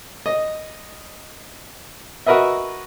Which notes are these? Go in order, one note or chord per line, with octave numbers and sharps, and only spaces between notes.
D#5
F#4 A#4 B4 D#5 E5